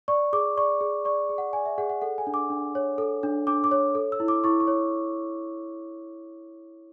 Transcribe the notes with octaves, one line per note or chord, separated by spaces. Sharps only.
D5 C#6
G#4 D6
D5 C#6
G#4
D5 C#6
G#4
F#5
D5 G#5
E5
G#4 F#5
F#5
A4 F#5
G#5
D4
D6
D4
C#5
A4
D4
D4 D6
D6
C#5
A4
E6
E4
D6
E4 C#6
C#6
C#5